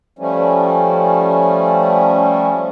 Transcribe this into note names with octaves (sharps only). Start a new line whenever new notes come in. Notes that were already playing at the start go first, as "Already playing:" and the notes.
F3 G3 A3 C#4